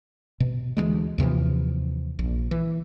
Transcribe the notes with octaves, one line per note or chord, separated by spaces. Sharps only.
B2
D2 E3 G3 G#3
D#2 C3 E3 F3
A#1
E3